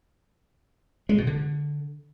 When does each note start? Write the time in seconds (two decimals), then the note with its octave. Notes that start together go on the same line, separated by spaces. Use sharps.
1.09 G#3
1.18 B2
1.27 D3